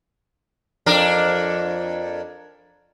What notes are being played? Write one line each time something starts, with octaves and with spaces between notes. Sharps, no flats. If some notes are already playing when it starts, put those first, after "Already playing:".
F2 D4 A#4